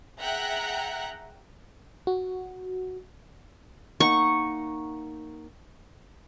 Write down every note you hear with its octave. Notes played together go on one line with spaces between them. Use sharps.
G#4 E5 F#5 G5 A#5 F#6
F#4
A#3 D#4 F#5 C#6